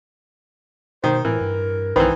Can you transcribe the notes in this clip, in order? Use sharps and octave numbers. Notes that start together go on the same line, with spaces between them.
B2 D#3 C5
A2 E3 A#4
G2
B1 D#3 E3 B4 C5 C6